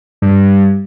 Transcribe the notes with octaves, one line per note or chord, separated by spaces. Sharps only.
G2